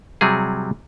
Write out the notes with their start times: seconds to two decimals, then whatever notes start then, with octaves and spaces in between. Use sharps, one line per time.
0.21 C3 F#3 G3 G#4